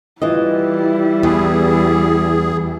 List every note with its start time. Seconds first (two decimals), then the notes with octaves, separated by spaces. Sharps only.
0.22 E3 G3 E4 F4 D#5
1.23 E2 G#4